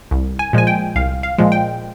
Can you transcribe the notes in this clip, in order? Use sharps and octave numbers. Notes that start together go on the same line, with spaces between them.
C2
G#5
A#2 F3 G#3 G#5
G5
C2 F5
F5
A#2 F3 G#3
G5